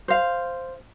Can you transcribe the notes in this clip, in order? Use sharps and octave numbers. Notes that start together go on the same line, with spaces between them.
C5 F5